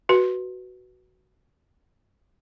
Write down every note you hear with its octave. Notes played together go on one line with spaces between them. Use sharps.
F#4 B4